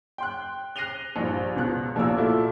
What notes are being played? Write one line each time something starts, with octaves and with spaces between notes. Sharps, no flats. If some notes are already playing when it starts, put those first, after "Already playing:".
G5 C6 F#6
F#6 A#6 C7 D#7 F7 G7
A#1 G2
C#2 B2 F#6
F1 A#1 A#3 F4 A#4 E6
A#2 A3 E4 F#4 A4